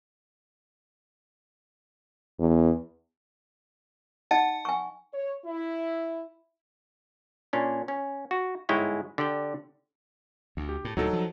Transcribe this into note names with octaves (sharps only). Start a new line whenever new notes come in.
E2
D#4 D#5 F#5 A5
G#5 C#6
C#5
E4
A#2 C#4 D4
C#4
F#4
G1 G#2 G#3 E4 C#5 G5
D3 G4 D5 G5
D2
G4
A2
D2 A#2 F#3 D#4 A4
F3